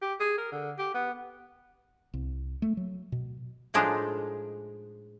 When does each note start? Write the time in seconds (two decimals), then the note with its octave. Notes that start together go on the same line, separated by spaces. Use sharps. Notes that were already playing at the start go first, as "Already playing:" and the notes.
0.02 G4
0.20 G#4
0.38 A#4
0.52 D3
0.78 G4
0.94 B3
2.14 C2
2.62 A3
2.77 F#3
3.12 B2
3.74 A2 F3 G#3 D4 D#4